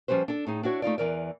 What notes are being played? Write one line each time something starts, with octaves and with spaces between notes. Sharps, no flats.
F3 G3 C#4 B4 C5
D4 A4
A2 D#4 G#4
D4 E4 F#4 C#5
A3 D#4 F4 D5
E2 E3 A#4 D5